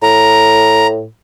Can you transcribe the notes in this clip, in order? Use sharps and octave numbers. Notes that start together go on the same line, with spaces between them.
A2 A#5